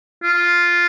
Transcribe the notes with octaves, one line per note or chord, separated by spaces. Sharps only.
F4